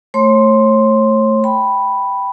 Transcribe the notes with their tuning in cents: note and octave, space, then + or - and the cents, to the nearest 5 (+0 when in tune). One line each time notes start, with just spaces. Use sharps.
A3 +0 C#5 -35 C6 +0
G5 +0 B5 +0